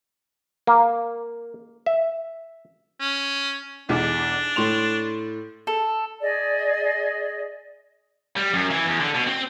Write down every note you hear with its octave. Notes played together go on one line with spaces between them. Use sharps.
A#3
E5
C#4
B1 E2 D4
A2 C6 F7
A4
G#4 D5 D#5
G3
F#2
E3
E2
D3
B2
C4